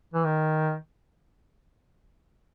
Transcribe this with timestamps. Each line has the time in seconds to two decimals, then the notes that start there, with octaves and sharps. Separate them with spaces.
0.14 E3
0.25 D#3